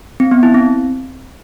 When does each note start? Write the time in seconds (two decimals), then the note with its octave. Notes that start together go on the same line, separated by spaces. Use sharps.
0.20 C4
0.31 B3
0.43 E4
0.54 C4